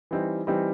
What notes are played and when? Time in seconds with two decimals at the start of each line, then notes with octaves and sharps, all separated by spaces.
0.11 E3 G3 C4 D#4
0.47 E3 G3 C4 D#4